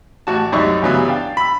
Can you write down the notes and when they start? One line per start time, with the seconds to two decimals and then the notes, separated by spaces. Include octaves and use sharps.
0.27 A1 F#4 A5
0.52 C2 F#2 D#4 D5 C#6
0.82 G2 C#3 E3 F#3 G3 B3
1.08 D4 F5 G5
1.37 B5 E6